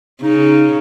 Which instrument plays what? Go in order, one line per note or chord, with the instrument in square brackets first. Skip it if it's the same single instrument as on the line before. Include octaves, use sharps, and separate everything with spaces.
[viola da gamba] C#3 [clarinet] D#4